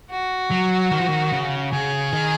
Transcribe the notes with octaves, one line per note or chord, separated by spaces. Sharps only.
F#4
F#3
D#3
F3
D#3
C#3
C#3 G#4
D#3